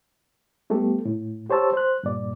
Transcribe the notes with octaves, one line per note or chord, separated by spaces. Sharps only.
G3 A3 B3 G4 A4
A2
G4 C5 C#5 A5 E6
C5 F#6
G2 A#2 D5